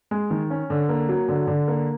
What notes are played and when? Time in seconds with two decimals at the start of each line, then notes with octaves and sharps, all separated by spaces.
0.11 G#3
0.30 D#3
0.50 C#4
0.70 D3
0.89 A#3
1.09 F#3
1.28 D3
1.47 D3
1.68 A#3